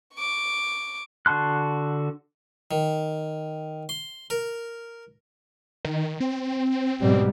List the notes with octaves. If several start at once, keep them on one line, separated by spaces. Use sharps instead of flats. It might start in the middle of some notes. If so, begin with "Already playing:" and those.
C#6 D6
D3 F#4 A5 C6 F#6
D#3
C6
A#4
D#3
C4
G#2 B2 G3